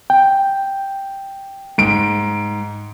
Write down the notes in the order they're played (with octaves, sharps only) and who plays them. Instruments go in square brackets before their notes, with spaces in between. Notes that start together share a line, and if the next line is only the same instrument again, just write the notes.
[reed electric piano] G5
[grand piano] G#2 D7